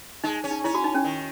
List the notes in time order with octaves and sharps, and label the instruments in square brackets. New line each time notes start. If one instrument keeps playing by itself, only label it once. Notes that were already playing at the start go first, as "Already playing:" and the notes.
[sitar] G#3 [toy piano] D#4
[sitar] C#4
[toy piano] D#4
[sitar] C#4 [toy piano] E4
[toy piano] F#4
D#4
C#4
[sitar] D#3